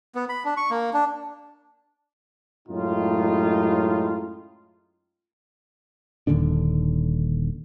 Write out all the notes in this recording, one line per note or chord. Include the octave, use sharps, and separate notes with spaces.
B3
B5
D4
C#6
A#3
D4
F#2 A2 G#3 D#4 F4
D#1 D#2 D3 D4